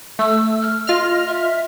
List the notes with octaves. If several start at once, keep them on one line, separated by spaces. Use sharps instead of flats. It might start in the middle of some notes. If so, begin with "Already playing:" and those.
A3 E6
F6
F4 D#5 F6
E5